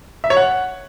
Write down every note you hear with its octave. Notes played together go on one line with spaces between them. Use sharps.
E5
C#5
F#5